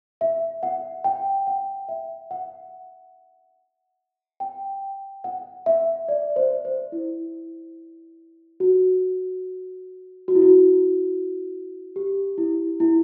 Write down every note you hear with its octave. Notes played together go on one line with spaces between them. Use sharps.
E5
F#5
G5
F#5
E5
F#5
G5
F#5
E5
D5
C5
C5
E4
F#4
F#4
E4
F#4
G4
E4
E4